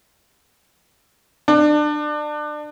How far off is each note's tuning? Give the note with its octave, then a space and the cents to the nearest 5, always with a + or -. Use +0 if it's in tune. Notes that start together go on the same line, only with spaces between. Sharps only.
D4 +25